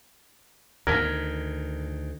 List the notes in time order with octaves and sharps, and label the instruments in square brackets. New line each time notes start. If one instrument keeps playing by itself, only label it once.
[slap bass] D2 D#3 [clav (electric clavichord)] A#4 [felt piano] G#6 B6